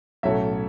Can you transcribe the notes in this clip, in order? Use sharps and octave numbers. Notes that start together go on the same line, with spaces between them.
B1 A2 F#3 A3 C#4 E5